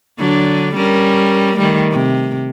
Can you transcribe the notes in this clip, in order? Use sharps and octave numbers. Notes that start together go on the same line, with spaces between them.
D3 F#3 D4
G3 C#4 A#4
D#3 G3 A3
C3